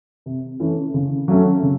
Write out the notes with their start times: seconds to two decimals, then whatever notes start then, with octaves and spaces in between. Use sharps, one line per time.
0.26 C3
0.60 E3 A3 C#4 E4
0.94 C#3
1.28 F#3 A3 C#4
1.63 C#3